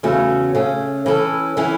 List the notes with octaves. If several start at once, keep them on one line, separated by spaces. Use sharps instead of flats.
E2 C#3 A3 C#4 F#4
C#3 A3 C#4
E3 C#4 A4
E3 C#4 E4